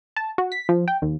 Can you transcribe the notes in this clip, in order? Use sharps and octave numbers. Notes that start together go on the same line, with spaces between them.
A5
F#4
B6
F3
G5
D#2